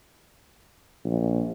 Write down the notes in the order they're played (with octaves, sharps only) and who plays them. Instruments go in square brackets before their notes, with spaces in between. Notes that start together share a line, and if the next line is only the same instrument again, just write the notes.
[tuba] A#1